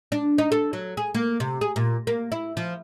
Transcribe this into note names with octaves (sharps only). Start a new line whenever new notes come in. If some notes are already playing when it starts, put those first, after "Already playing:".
D4
D#4
A4
F#3
G#4
A#3
C3
G#4
A#2
A#3
E4
F3